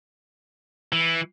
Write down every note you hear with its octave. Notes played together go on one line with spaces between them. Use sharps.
E3